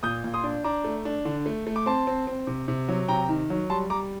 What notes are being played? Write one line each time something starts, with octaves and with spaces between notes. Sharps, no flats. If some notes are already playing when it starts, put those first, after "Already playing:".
A#2 D#6 G6
A#2
C6 D#6
D4
D4 A#5 D6
A3
D4
D3
A3
A3
D6
C4 A5 C6
C4
C4
C3
C3
F#3
C3 G5 A#5
D#3
F#3
G3 A5 C6
G3 A#5 D6